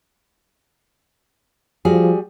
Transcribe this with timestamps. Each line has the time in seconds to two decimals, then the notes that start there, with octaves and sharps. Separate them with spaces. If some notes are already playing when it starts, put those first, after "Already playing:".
1.85 F3 G3 F#4 G#4